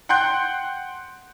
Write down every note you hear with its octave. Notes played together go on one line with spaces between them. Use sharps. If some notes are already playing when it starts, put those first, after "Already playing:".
F#5 G5 C6 F#6 G6